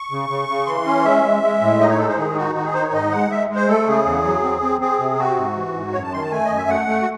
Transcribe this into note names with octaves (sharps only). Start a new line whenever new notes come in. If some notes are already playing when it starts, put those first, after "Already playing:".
Already playing: C#6
C#3
C#3
C#3
E3 C6
C#4
G#3 E5
G#3
G#3
A2
D#4 D#5
C#5
G#3 A4
C5
D#3 G#4
D#4 F#4
D#3 F#4
G#4
D#4 C5
C#5
G#2 D#5
G#3 F#5
G#3 E5
G#3
C5
A3 A4
C#3 G#4
E2
F#3
C4
C4
C4 G#4
C3
C4 F#4
G#2
E3
G#2
F#2 C#5
A5
D#3 C6
A5
A3 G#5
F#2 D#5
E5
A3 F#5
A3
F#4